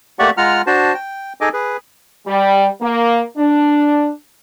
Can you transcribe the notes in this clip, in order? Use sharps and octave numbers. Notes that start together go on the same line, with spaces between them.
A3 A#3 G4 D5 F#5 C#6
G#3 F4 F#5 A#5 F6
D4 F#4 C5 A5
G5
D#4 G#4 A4 D#5 G#5 D6
G#4 B4
G3
A#3
D4